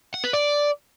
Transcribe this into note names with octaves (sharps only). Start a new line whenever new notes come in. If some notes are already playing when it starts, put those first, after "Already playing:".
F#5
B4
D5